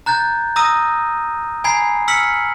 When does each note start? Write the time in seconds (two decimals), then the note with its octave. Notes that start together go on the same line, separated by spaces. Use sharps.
0.06 A#5 F#6 G6 A6
0.56 A#5 D#6 E6 A#6 D#7
1.64 G#5 A#5 B5 G#6 C7
2.08 E6 F6 B6 C#7 F#7